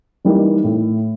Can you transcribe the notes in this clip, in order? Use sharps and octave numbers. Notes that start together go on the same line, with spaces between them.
E3 G3 A#3 D#4
A2